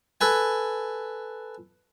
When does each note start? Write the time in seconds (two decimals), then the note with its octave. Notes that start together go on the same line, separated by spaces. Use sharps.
0.21 A4 B4 G#5